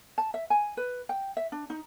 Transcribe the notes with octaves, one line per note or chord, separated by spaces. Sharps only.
A5
E5
G#5
B4
G5
E5
D4
D#4